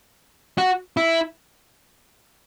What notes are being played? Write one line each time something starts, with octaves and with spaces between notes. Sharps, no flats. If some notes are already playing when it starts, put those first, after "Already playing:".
F#4
E4